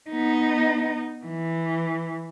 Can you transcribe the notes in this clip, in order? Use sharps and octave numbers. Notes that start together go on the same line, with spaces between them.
B3 D#4
E3